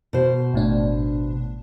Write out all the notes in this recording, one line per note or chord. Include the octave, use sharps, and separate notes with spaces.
B2 C5
G#1 A2 D4